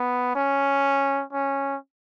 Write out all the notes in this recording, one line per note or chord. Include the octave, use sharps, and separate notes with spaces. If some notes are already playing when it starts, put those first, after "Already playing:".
Already playing: B3
C#4
C#4